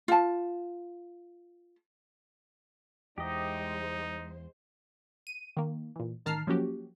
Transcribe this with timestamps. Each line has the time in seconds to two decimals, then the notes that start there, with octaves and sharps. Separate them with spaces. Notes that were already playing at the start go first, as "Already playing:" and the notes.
0.08 F4 A5
3.18 E2 G#3 D#4 G4 C5 D#5
5.27 D#7
5.57 D#3 A#3
5.96 A#2 E3
6.26 A1 D#3 A5 A#5 F6 C7
6.47 F3 F#3 A#3 C#4 F#4 G4